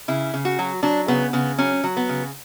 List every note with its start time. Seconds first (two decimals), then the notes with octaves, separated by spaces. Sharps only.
0.08 C#3 E4
0.34 C#3
0.45 F#4
0.59 F#3
0.83 F#3 D4
1.08 C#3 B3
1.33 C#3 B3
1.58 F#3 C#4
1.84 F#3
1.97 B3
2.09 C#3